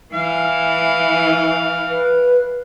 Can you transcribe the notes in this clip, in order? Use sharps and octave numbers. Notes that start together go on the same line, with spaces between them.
E3 F5
B4